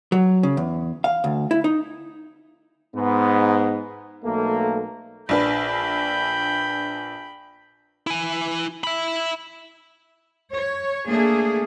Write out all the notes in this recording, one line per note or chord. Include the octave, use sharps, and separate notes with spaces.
F#3
C#3
E2
F5
D2
E4
D#4
G#2 B3
B1 A3 A#3
A#1 D4 B4 G5 B5
E4 G#5
E5 B5
C#5
A3 A#3 D4 G#4